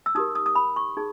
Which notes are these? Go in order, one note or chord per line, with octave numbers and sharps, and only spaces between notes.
E6
D#4 G4 A#4 D#6
D#6
D#6
B5
C#6
D#4 G#4